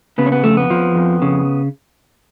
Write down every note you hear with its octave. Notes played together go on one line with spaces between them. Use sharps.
C#3 B3
C#4
B3
F2 A3
B3
F3
F2
C#3